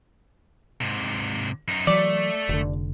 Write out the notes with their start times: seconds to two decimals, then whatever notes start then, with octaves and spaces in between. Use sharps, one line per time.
0.81 G#2 C3
1.68 F#2 D#4
1.87 E3 F#3 A3 D5
2.49 F1 D3